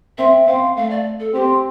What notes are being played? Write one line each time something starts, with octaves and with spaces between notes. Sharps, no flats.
C4 E5
C4 F5
A3 F5
D5
A4
C4 G4